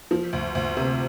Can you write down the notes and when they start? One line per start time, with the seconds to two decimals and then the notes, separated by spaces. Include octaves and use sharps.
0.11 F3
0.33 D2
0.55 D2
0.77 C3